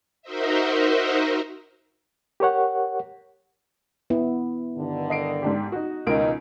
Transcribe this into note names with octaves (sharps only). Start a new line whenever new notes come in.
D#4 F#4 A#4 C5 D#5 E5
G4 A#4 C#5 F#5
B3 E4
G2 D3 D#3
D#5 C7 D7
G#2 D4 G4
D#4 F#4
C#2 B2 D#3 D#4 A#4 D7